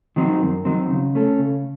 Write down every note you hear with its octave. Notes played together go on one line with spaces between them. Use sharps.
D#3 F#3 C4 D#4
F#2
D#3 F#3 C4 D#4
C#3
A3 C#4 A4
C#3